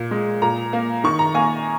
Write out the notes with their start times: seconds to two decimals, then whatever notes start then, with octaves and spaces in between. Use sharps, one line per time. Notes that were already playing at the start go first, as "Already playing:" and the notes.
Already playing: A#2
0.11 G#3
0.42 A#2 A#5
0.73 A#3
1.04 D#3 C#6
1.19 A#5
1.34 A#3 G#5